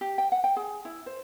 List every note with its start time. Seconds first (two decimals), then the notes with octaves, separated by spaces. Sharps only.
0.01 G4
0.18 G5
0.32 F#5
0.44 G5
0.57 G#4
0.85 E4
1.06 C5